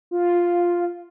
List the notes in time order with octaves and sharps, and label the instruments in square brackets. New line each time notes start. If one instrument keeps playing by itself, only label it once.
[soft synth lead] F4